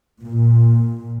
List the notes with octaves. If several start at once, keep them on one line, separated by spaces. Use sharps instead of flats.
A#2